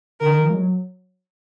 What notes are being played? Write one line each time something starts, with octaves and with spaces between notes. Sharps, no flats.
D3 A#4
D#3
F3
G#3
F#3